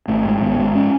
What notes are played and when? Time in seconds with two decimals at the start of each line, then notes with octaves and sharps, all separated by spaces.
0.08 G#1 A3
0.25 G#2
0.41 G#1 B3
0.58 G#2
0.75 C#4